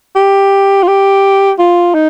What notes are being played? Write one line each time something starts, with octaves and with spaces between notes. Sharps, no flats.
G4
F4
G4
F4
D#4